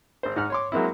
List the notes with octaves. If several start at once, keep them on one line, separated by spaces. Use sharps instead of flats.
G#1 C5
G#2 F#5 F6
C#5 C6 D6
F#3 G#3 A#3 C4 E4